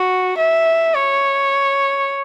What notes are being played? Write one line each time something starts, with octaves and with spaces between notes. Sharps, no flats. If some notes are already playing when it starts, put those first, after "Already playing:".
Already playing: F#4
E5
C#5